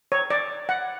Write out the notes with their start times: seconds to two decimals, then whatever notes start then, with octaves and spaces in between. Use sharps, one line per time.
0.12 C#5
0.30 D5
0.69 F#5